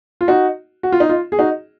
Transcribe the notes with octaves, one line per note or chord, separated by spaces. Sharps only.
F4
D#4 F#4
F#4
F4
D#4
F4
G#4
D#4 F#4